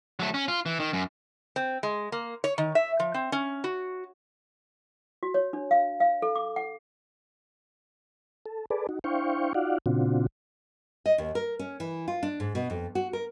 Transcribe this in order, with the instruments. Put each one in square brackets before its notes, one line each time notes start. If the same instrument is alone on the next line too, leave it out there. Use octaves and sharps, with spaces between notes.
[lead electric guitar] F#3 A3
C#4
F4
E3
D#3
F#2
[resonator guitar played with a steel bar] C4
G#3
A#3
C#5
D#3
E5
F3
C4
C#4
F#4
[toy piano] F#4
C#5
D4
F5
F5
A4
D6
F#5
[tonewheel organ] A4
G#4 A4 B4 D5
D#4 F#4
D4 E4 C5 F5 G5 C#6
D#4 F4 F#4 D5 F5 F#5
A#2 C#3 C4 D4 F4 F#4
[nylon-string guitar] D#5
D#2
A#4
C#4
E3
F4
D4
G#2
B2
F2
F#4
A#4